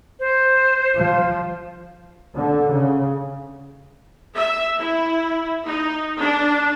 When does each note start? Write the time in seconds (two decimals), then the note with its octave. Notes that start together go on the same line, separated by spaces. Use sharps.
0.20 C5
0.96 F3
2.38 D3
2.74 C#3
4.35 E5
4.78 E4
5.64 D#4
6.19 D4